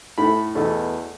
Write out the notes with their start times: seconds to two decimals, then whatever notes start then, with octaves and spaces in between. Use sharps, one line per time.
0.18 A2 A3 B5
0.55 E2 B2 A3